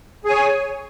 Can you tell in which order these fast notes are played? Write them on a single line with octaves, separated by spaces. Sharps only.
G#4 G#5 C#5